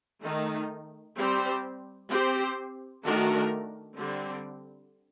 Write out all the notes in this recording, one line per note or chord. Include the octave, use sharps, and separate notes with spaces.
D#3 A3 D#4
G3 C4 G4 C5
C4 G4 C5
D#3 A3 D4 F#4 A#4
D3 G3 C4